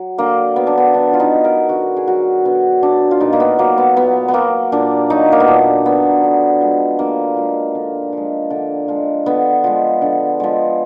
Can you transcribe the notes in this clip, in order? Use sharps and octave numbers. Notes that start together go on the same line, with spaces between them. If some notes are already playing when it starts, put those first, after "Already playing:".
Already playing: F#3
D3 A#3
F#3 B3
D4
B3
D3 D4
F4
D#4
F#3
A#4
D3 F#4
G#4
F#3 F#4
D3 B3
F#3 D4
F4
A#2 D#4
A#3
B3
F#3 A#3
B3
A#2 B3
B3
F#3 A#3
A#2 D4
F#3 D#4
A#3
B3
A#2 D4
F#3 B3
D3
F3 G#3
D3 A#3
F3 G#3
D3
F3 G#3
D3
F3 G#3
D3 B3
F3 G#3
D3
F3 G#3